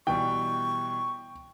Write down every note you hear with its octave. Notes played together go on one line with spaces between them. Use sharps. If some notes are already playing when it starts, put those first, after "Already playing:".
B2 E3 G3 G5 C#6